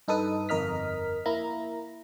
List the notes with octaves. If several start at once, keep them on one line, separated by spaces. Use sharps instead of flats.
G2 D#4 A4 B4 D#6
G1 F2 A#4 D#5 F6 B6
A#3 E4 A#5